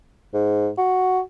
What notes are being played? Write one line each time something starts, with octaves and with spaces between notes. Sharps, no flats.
G#2
F#4